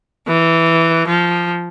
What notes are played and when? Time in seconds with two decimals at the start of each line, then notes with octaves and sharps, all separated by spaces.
0.28 E3
1.08 F3